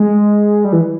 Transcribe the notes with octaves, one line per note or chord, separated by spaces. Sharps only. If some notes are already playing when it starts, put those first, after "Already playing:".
Already playing: G#3
G3
E3